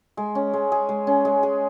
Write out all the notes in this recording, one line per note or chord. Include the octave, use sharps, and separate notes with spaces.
G#3
C#4
G#3
G#4
G#3
C#4
G#3
G#4